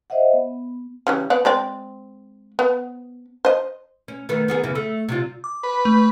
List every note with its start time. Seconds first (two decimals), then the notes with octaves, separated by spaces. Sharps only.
0.10 C5 D#5 E5 F#5
0.33 B3
1.07 C#3 E3 G3
1.30 B3 D5 F#5
1.45 G#3 C4 D5
2.59 B3
3.45 C5 D#5
4.08 C#4
4.29 D#3 A3 B3
4.48 D#3 B3 G#4
4.63 F#2 C#3 E3
4.75 A3
5.09 C3 G3 F4
5.44 D6
5.63 B4
5.85 A3